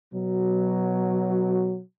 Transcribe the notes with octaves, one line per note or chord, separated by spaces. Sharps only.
B2 F#3